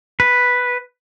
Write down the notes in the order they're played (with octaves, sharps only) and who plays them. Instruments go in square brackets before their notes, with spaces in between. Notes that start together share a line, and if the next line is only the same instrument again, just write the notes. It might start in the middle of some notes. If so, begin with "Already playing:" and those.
[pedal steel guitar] B4